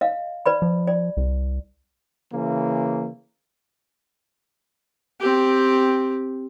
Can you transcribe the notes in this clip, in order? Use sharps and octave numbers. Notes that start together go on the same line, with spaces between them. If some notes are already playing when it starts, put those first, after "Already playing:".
D#5 F5
B4 D5 B5
F3
D5
C2
C#3 E3 A#3
C4 G4